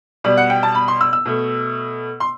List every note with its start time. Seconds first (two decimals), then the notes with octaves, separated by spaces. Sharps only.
0.24 B2 G3 D5
0.37 F#5
0.50 G5
0.63 A5
0.75 B5
0.88 C6
1.01 E6
1.13 E6
1.25 B2 A3
2.20 C6